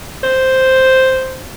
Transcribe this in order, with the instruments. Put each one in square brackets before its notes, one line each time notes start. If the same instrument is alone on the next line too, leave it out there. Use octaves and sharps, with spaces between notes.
[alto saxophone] C5